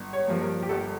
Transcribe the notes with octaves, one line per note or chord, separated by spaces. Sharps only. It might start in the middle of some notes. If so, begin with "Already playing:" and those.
Already playing: G1
C#5
G2 F3 A#3
A#4
G4
G1 A4